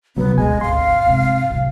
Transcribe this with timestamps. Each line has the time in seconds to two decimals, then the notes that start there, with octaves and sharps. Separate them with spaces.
0.16 D#1 C2 C#3 F#3 B3
0.38 D2 B2 G#3 G#5
0.61 G#1 D2 F5 C6
1.06 G#2 C3
1.50 C2 A2